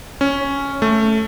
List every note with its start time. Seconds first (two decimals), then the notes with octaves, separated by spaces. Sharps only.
0.21 C#4
0.82 A3